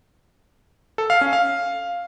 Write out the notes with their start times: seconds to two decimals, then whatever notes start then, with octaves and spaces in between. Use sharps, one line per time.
0.98 A4
1.10 F5
1.21 C#4
1.33 F5